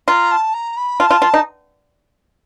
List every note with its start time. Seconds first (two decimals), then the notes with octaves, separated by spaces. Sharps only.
0.08 F4 A#5
0.31 A5
0.54 A#5
0.77 B5
1.00 F4 A5
1.11 F4
1.22 F4
1.34 D#4